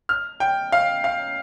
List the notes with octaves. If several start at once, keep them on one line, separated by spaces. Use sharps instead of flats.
F6
G5
F5
F5